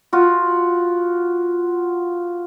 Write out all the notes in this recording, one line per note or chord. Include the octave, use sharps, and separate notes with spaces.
F4 F#4